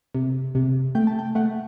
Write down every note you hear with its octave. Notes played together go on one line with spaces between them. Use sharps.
C3
C3
A3 G5
A5
G5
A3 F#5